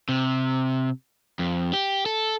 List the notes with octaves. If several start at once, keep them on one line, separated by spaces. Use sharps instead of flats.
C3
F2
G4
A4